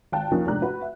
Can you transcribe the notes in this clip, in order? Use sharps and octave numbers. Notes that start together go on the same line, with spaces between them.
G#1 F5 G5 A5 F#6
D#2 D#3 F3 A#3 C#4
F1 G#2 D4 A#5 F#6
F#4 B4 F#5
E5